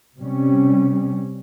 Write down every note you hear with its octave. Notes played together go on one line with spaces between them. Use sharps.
C3 G3 C#4